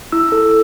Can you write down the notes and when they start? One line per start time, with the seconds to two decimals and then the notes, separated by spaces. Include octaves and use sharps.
0.12 E4 E6
0.32 A4